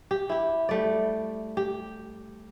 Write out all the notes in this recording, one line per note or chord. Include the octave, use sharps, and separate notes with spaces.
G4
E4 G4
G3 A3 D5
G4